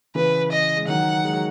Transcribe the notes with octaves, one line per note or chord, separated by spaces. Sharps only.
C#3 E3 B4
D#5
G#3
D#3 F#3 F#5
G#3
F#3